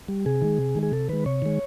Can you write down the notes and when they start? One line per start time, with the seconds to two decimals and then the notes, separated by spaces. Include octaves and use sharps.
0.08 G3
0.26 C3 G#4
0.42 D#3 G#3
0.58 C3
0.75 D#3 G#3
0.83 G#4
0.92 C3 A4
1.09 D#3 G#3 B4
1.26 C3 C#5
1.42 D#3 G#3